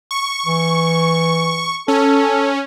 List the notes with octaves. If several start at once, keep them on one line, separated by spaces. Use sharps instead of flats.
C#6
E3
C#4 A4